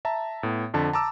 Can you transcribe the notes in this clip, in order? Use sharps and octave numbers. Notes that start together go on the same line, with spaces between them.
E5 A5 A#5
A2 B3
F2 D3 A5
A5 A#5 D6 E6